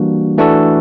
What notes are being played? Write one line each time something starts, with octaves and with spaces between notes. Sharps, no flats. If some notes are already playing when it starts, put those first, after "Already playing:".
Already playing: E3 G3 A#3 D4 F#4
E3 A3 D4 F#4 A4